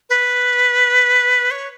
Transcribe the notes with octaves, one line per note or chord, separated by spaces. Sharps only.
B4
C#5